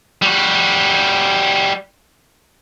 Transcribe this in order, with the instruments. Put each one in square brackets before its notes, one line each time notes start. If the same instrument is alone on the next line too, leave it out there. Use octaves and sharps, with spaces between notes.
[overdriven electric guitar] G3 F#4